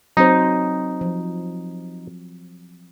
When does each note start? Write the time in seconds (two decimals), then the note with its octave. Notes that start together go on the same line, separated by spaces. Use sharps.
0.17 F#3 C4 D#4 C5
1.01 F3